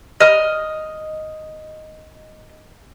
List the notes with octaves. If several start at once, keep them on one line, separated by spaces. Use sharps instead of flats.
D#5 F6